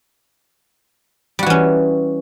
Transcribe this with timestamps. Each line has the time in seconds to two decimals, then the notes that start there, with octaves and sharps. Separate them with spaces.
1.39 G3
1.43 F#4
1.46 E3
1.50 C#4